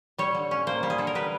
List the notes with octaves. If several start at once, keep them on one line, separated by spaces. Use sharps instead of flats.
G3 C#5
D3
C#4
A#3 C5
G3
G#4
D3 A4
A#4
G3 B4